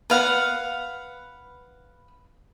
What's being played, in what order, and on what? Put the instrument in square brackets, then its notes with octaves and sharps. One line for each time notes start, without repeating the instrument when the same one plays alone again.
[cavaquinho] B4 F5 F#5